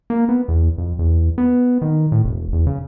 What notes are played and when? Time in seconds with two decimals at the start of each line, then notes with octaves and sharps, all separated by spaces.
0.10 A#3
0.29 B3
0.48 E2
0.78 F2
0.99 E2
1.38 B3
1.82 D#3
2.12 A2
2.24 E1
2.53 E2
2.67 C#3